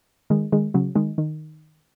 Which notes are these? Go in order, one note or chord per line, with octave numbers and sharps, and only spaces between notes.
D#3 G#3
D#3 G#3
C#3 F#3
D#3 G#3
D#3